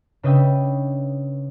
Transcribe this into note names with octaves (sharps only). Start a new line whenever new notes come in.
C#3 D4 B4 D#5 E5 G5